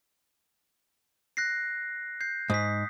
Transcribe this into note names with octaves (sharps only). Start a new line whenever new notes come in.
F#6 A#6 C7
G6 C7
G#2 D#6 B6